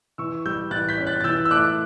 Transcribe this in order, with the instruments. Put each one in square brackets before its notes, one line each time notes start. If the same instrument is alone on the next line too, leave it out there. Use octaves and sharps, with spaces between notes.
[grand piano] E3 C#6 E6
G3 E6 G6
E3 F#6 A6
G6 B6
C#4
F#6 A6
A6
E3 E6 G6
E6
A3 D6 F#6